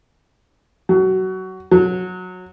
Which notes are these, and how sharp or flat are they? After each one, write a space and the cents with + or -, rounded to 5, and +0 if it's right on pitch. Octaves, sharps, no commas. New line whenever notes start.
F#3 +20
F#3 -20